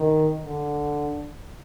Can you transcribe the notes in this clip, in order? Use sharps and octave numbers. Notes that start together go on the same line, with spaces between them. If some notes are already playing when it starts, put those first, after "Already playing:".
Already playing: D#3
D3